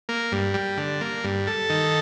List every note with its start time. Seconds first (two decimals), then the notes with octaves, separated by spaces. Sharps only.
0.09 A#3
0.32 G2
0.54 G3
0.78 D3
1.01 A#3
1.24 G2
1.47 A4
1.70 D#3